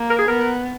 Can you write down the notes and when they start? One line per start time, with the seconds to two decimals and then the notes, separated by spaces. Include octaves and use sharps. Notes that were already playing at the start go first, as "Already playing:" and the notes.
Already playing: A#3
0.10 A#4
0.19 G#4
0.28 B3 A#4